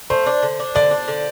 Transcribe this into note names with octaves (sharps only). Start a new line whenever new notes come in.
A3 C5
D4
D3
D4
D3 D5
D4
D3